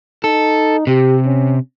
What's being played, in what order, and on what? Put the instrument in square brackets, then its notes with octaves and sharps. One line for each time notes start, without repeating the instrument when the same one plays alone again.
[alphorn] D#4 [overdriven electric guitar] A4
[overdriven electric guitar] C3 [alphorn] G4
[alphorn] C#4